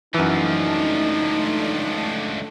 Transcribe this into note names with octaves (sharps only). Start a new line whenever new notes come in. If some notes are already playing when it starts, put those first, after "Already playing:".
C#2 F#2 E3 F3 A3 D4 D#4